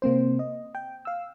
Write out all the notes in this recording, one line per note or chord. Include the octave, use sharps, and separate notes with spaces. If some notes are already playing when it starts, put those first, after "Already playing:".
C3 A#3 C4 C5
D#5
G5
F5 E6